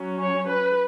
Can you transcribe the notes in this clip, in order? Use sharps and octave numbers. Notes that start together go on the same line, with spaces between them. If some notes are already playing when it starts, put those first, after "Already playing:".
Already playing: F#3 C#4
C#5
B4